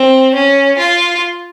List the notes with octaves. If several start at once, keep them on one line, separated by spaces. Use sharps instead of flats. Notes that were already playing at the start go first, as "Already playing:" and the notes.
Already playing: C4
C#4
F4